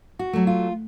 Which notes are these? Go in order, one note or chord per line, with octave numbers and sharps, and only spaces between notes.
F#4
F#3 A3
F4